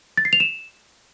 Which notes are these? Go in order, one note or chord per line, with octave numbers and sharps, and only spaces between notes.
A6
C7
F7
E7